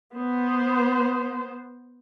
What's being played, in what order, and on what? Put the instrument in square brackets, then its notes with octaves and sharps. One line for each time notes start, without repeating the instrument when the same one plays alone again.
[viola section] B3 C5